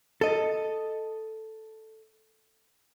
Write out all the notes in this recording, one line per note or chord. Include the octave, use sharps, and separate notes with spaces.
A4 D#5